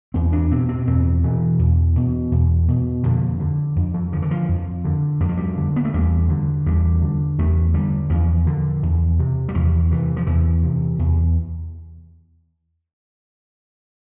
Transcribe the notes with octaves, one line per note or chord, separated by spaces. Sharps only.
E2 C4
D4
B2 C4
C4
E2 C4
B2 E3
E2
B2
E2
B2
F2 D3
D3
F2
F3
D3 F3
E3
F3
F2
D3
F2 G3
F3
G3
D3
B3
A3
E2 G3
D3
E2 G3
D3
E2 A3
D3 G3
E2 F3
D3
E2
C3
G3
E2 F3
C3 E3
F3
E2 E3
C3
E2